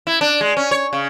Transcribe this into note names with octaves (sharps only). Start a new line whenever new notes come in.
E4
D4
G#3
C#4
C#5
C#3